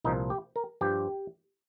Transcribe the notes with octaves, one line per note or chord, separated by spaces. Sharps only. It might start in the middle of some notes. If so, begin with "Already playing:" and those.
C2 A#2 F3 D#4
G4
A#4
G2 F3 G4